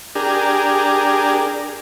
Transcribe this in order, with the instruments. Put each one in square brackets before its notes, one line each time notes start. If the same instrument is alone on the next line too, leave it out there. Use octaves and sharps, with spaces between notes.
[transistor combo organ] D4 G4 G#4 A#4